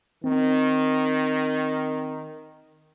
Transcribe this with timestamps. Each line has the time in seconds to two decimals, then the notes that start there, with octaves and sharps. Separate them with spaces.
0.24 D#3 C4